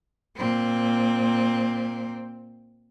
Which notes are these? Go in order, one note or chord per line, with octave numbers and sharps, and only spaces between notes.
A#2 C4